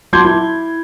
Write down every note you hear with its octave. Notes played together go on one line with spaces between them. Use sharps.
F#3 A5 C6 D6 G6 G#6
E4